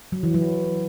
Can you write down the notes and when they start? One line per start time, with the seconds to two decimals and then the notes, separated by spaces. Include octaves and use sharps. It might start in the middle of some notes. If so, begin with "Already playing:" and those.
0.12 F#3
0.23 E3
0.34 F#3